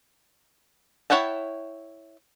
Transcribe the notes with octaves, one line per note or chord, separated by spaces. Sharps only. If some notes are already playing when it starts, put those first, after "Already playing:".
E4 C#5 F#5 G5 A5